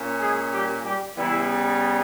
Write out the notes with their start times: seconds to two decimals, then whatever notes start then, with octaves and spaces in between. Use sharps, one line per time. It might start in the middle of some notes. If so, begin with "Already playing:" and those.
Already playing: A#2 C#4
0.21 G#3 G#4
0.53 G3 G4
0.85 G3 G4
1.17 C#3 E3 G3 B3 E4